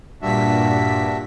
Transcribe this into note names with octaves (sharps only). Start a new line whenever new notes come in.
G2 A#2 D4 F#4 E5 B6